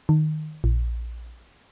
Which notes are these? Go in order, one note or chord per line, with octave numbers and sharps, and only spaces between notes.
D#3
A#1